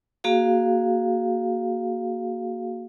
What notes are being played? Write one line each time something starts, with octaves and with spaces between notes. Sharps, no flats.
A#3 F#4 G#4 F5